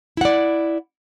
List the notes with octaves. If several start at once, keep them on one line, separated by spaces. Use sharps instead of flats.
E4 D5 F#5